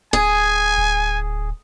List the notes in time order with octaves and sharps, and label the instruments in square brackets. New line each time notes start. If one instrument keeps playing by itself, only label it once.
[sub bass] D1 [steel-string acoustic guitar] G#4 [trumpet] G#5
[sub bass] D1